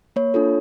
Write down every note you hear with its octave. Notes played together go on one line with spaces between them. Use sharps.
A#3 C#5
D4 F4 A4